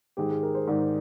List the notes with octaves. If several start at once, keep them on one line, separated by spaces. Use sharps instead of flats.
G#2 D#3 G#3 G4
G#4
A#4
C5
G#2 D#3 G#3 D5